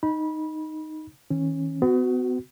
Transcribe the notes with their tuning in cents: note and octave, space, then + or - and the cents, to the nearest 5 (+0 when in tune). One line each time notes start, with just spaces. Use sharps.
D#4 +0 B5 -25
D#3 +40 C#4 -20
B3 +40 F#4 +0